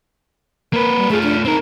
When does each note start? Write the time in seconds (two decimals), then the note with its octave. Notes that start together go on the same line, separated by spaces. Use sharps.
0.73 A#3 A#4 B4
0.97 G3
1.10 A3 F4 G#4
1.23 D4
1.45 C4 D#4 A#4